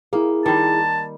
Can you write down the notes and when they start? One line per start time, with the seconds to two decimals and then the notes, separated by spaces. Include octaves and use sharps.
0.13 A#3 E4 G#4
0.46 D#3 G3 A5